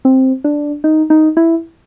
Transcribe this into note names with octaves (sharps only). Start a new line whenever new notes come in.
C4
D4
D#4
D#4
E4